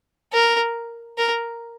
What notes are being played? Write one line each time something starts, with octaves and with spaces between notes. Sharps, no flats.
A#4
A#4